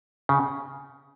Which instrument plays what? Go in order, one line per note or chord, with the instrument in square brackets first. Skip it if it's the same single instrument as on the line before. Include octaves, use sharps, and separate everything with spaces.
[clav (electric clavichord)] C#3